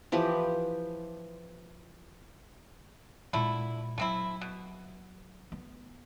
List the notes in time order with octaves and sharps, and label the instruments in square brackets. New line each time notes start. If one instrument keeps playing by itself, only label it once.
[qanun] E3 F3 G4 B4
[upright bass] A#2 G#3 [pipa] D3 A3 E4
[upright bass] F#3 [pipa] A3 C4 E4
[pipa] B2
[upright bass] B3